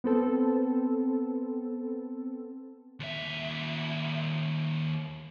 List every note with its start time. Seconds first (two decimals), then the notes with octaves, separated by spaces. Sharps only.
0.04 B3 C4 A4
3.00 D#2 E5